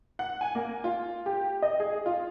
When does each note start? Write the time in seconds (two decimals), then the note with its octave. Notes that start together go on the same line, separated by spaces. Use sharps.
0.19 F#5
0.41 G#5
0.55 A#3
0.84 F4
1.26 G4
1.62 D#5
1.80 G#4
2.06 F4